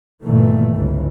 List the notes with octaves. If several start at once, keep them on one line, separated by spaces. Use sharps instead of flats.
G1 A#2 D#3 E3 A3
G1 C#2 G#2 E3